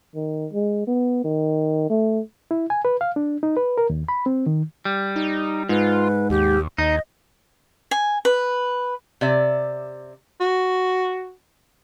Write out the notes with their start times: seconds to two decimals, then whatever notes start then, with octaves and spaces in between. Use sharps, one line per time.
0.15 D#3
0.53 G#3
0.87 B3
1.24 D#3
1.90 A3
2.51 E4
2.70 G#5
2.85 B4
3.01 F5
3.16 D4
3.43 D#4
3.57 B4
3.78 A#4
3.90 D#2
4.09 B5
4.26 C4
4.46 D#3
4.85 G3
5.16 D#4
5.69 G#2 F4 B4
6.30 D#2 G4
6.78 D#2 D#4 D#5
7.91 G#5
8.25 B4
9.21 C3 D5 E5
10.41 F#4